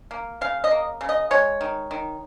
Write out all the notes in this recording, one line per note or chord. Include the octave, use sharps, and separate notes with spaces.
A#3
C#3 F5
D#5
A#3
C#3
D#5
G#3 C#5
D#3
D#3